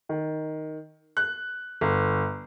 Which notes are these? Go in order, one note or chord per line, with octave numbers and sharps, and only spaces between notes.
D#3
F#6
G1